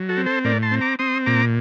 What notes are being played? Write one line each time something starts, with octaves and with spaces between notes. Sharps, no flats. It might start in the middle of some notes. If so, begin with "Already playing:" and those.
Already playing: F#3
F#4 A4
C4
A4 C5
A2 A#4 D5
A5 C6
C4
A#5 D6
C4 C6 D#6
A#2 A#5 D6